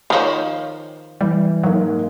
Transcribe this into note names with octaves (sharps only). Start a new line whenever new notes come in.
D#3 F3 C#5
E3 G3
G#2 F#3 A#3